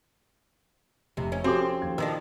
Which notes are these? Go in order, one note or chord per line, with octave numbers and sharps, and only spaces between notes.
F1 C3
C#4
F3 C4 F#4 G4 A4 G#5 D6
D#2 F3 G#6
D#3 F3 D4 E6 A#6